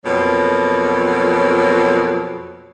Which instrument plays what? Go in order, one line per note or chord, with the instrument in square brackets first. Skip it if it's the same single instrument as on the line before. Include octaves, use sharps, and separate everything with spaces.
[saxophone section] F2 B2 F#3 A#3